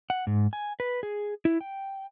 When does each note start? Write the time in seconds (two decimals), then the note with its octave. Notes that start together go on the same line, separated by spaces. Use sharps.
0.10 F#5
0.27 G#2
0.53 G#5
0.80 B4
1.03 G#4
1.45 E4
1.61 G5